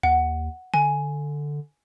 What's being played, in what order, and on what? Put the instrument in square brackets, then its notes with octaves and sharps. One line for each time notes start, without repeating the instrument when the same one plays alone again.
[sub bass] D#2 [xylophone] F#5
[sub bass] D3 [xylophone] G#5